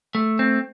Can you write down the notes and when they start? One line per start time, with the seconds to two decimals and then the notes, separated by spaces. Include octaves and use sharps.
0.15 A3
0.39 C4